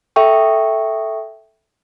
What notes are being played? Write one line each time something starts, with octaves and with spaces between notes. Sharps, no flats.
A4 E5 G5 C#6